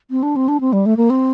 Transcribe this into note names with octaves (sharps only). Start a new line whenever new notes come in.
C4
D4
C4
D4
C4
G3
A3
A#3
C4